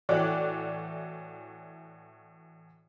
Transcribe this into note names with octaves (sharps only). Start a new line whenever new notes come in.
A2 E3 F#4 C#5 D5 F#6